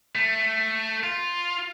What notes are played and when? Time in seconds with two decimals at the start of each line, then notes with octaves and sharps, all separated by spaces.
0.15 A3
1.03 F4